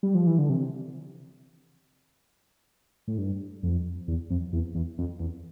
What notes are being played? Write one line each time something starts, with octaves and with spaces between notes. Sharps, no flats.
G3
F3
E3
D3
C3
A2
G2
F2
E2
F2
E2
E2
F2
E2